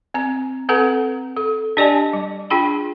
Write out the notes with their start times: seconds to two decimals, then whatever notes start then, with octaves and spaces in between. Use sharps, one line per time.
0.14 C4 A#5
0.69 C4 A4 B4 F#5 A#5
1.37 A4
1.77 D4 G4 D5 D#5 G#5 A5
2.13 G3
2.50 D4 F4 G#4 G5 B5